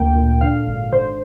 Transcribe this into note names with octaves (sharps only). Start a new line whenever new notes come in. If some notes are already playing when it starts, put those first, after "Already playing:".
Already playing: D2 A#3 G5
A#2
D3 F5
G#1
D3 C5